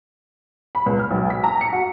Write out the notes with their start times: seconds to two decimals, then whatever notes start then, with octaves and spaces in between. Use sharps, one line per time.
0.75 B5
0.86 C#2
0.99 F6
1.11 B1
1.30 B6
1.44 A#5
1.61 C#7
1.73 F#4